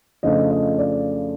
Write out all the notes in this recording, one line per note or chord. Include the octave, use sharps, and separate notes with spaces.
F2 C#3 F3 A3 D4 D#5
D#5
D5